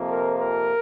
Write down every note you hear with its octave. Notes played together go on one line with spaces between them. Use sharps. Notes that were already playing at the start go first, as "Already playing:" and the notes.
Already playing: F2 C3 F3 A#3
A#4
A#4